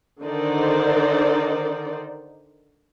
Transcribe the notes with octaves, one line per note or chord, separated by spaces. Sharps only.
D3 D#3 D#4 A#4 C5 D5